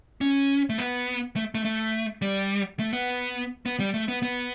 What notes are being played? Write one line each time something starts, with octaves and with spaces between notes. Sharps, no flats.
C#4
A3
B3
A3
A3
A3
G3
A3
B3
B3
G3
A3
B3
B3